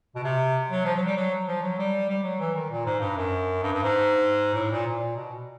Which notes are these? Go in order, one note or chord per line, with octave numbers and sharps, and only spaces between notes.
B2
C3
F#3
F3
F#3
G3
F#3
F3
F#3
G3
G3
F#3
E3
D#3
A#2
G#2
G2
F#2
G2
G2
G#2
A2
A#2
A#2
B2